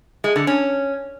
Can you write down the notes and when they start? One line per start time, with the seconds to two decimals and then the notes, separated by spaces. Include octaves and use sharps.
0.24 G#3
0.36 D3
0.47 C#4